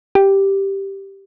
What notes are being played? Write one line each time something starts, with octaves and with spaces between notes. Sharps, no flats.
G4